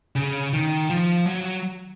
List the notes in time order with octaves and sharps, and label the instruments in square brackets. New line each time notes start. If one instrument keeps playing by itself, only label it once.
[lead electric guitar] C#3
D#3
F3
F#3